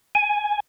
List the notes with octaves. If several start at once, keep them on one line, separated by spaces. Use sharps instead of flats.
G#5